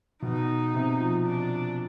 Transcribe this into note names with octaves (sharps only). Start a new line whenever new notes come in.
B2 D#4
C3
F3
D4